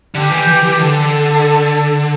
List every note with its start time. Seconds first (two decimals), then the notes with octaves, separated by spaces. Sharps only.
0.14 D3 G4
0.31 E3
0.47 E3
0.63 E3
0.79 D3 A4